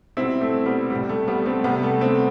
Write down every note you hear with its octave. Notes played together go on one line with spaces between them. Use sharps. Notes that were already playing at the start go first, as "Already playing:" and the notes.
B2 G3 C4 E4
A3 C4
G3 B3
G3
A2
A3
G3 B3
A3 C4
C3 G3 B3
A3
A3 C4